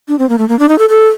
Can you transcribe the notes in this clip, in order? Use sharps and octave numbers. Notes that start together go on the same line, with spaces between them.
D4
C4
A#3
A3
A#3
D4
D#4
A4
A4